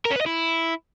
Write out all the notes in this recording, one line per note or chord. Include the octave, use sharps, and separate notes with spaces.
A#4
C#4
B4
D#5
E4